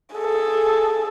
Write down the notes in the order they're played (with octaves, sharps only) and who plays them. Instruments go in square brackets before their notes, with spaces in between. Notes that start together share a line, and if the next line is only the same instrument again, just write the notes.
[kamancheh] G#4 A4